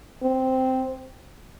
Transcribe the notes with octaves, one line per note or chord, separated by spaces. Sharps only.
C4